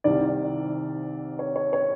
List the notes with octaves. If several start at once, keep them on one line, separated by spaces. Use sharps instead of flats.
C2 C3 D#3 D5
C#5
C#5
C#5